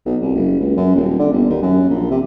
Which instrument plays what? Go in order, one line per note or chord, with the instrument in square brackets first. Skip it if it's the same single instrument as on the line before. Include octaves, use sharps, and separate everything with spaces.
[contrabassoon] B1
C2
F#1
C#2
F#2
D#1
D3
G1
D#2
F#2
A#1
C3